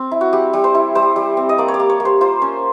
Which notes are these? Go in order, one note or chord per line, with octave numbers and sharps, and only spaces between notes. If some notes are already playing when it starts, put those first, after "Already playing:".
Already playing: C4
E4
F#4
G3 G4
G3
C5
E4
G3 C5
G3
C4
D#5
A#3 D5
C#5
D5
A#3
C#5
A#3
C5
F4 C5
C#4